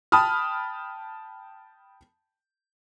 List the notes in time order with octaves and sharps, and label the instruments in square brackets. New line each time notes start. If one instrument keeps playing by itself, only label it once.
[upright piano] G5 A5 B5 D#6 F6